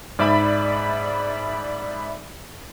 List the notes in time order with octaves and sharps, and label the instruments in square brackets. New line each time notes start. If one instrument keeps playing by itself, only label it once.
[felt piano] G#2 [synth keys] D5 E5 B5